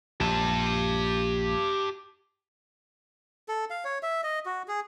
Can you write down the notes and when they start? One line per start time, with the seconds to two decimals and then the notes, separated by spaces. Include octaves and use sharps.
0.21 A#1 G4 A5
3.48 A4
3.70 F5
3.85 C#5
4.03 E5
4.24 D#5
4.46 F#4
4.68 G#4